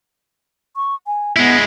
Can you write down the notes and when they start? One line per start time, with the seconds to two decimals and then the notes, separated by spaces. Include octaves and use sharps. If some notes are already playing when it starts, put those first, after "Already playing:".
0.76 C#6
1.06 G#5
1.36 G#3 B3 E4